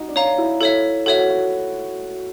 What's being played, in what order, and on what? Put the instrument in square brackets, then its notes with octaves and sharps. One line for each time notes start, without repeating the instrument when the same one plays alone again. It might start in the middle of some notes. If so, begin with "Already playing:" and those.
Already playing: [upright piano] D#4 F#4
D4
[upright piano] D#4 [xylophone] C#5 F5 A#5
[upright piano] E4
[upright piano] E4 [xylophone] A4 C#5 E5
[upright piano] F#4 [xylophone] A4 C#5 E5
[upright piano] F#4
F#4